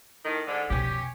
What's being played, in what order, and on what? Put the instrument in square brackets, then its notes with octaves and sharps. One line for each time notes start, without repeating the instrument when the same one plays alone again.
[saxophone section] A2 D#3
G#2 D3
[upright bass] F2 B2 [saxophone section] C#4 G4